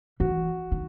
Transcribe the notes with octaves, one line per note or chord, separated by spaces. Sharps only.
E3 F#4
D#3